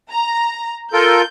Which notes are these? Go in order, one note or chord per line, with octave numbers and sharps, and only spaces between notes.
A#5
F4 A4 A#4 G6